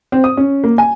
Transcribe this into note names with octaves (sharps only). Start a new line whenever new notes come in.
C4
D#6
C#4
A#3
G#5